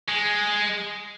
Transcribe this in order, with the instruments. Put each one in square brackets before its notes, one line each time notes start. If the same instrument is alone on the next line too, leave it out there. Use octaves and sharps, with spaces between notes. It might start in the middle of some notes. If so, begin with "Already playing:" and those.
[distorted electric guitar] G#3